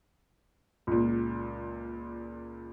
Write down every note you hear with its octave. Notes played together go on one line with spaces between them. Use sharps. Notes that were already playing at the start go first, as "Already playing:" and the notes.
C#2 A#2